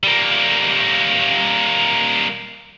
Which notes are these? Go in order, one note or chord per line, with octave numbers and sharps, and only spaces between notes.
G3 A#3